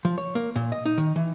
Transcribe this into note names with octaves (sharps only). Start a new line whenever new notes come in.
F3
C#5
A#3
A#2
D#5
D#4
D#3
E3